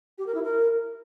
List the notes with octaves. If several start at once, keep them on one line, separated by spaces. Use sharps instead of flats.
G4
A#4
E4
A#4